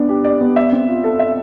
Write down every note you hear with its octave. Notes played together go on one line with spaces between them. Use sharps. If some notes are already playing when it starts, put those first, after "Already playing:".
Already playing: B3 D4 D5
G4
D5
B3
E5
C4
F4
A4
E5